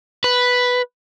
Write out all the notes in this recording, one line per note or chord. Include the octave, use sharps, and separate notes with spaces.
B4